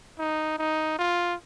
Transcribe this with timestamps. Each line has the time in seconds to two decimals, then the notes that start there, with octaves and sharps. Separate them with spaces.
0.19 D#4
0.59 D#4
0.99 F4